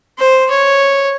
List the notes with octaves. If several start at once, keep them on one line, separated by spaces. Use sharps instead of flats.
C5
C#5